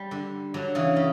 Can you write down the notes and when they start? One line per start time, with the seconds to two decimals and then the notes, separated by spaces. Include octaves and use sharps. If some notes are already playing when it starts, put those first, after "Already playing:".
Already playing: G3
0.11 D3
0.54 D3 F#3
0.75 C#3 E3
0.96 C#3